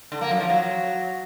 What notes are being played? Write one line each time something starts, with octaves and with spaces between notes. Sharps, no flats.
D3
A#3
F#2
F3
F#3